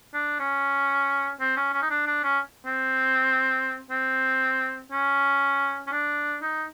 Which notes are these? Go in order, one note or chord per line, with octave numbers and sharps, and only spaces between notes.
D4
C#4
C4
C#4
C#4
D#4
D4
D4
C#4
C4
C4
C#4
C#4
D4
D#4